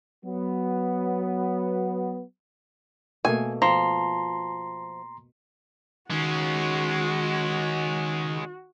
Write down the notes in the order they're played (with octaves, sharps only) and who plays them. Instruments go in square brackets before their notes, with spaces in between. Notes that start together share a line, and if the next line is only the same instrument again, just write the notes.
[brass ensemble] F#3 B3
[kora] B2 A3 A#3 [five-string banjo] G#5
[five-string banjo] F3 [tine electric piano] A#5 C6
[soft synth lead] D#3 [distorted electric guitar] G#3 C#4 [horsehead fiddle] F#4